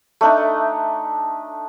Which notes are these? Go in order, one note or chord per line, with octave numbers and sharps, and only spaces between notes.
A3 D4 D#4